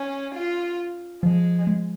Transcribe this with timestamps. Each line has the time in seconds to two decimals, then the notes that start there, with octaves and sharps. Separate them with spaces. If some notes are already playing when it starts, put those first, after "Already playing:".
Already playing: C#4
0.35 F4
1.23 F3 G#3
1.67 G#3